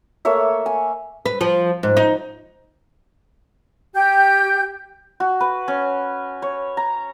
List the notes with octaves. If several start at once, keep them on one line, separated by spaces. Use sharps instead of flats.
A3 A#3 C#5 E5
G#5
B4
F3
G#2
D#4
G4 G5 G6
F#4
B4
C#4
C#5
A#5